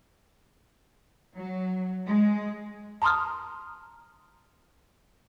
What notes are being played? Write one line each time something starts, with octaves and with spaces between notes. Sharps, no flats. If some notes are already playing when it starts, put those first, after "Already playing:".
F#3
G#3
A5 A#5 C6 D#6 F6